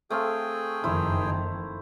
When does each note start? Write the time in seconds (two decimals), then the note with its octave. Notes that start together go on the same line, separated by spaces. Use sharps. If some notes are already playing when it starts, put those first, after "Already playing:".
0.10 A3 C4 G#4 F5 G5
0.84 F#1 F2 D#3 E4 C5